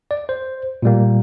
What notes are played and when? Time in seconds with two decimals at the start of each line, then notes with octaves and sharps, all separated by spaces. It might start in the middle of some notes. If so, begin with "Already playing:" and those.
0.11 D5
0.29 C5
0.82 A#2 G3 A#3